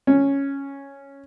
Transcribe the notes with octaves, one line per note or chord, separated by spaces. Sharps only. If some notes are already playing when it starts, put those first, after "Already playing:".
C#4